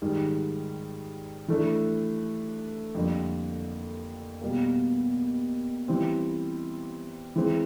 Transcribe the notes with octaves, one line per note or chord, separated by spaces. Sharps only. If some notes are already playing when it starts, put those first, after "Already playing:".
G#2 D#3 G3
E3 A3 D4
F2 D3 G3 A#3
B2 G3 A#3
E3 G3 C4
E3 G#3 C4